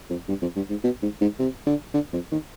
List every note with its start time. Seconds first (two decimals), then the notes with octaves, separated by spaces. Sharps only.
0.10 F2
0.28 G2
0.42 F2
0.56 G2
0.70 G#2
0.84 B2
1.02 G#2
1.21 G#2
1.39 C3
1.66 D3
1.94 D3
2.13 F2
2.32 D#3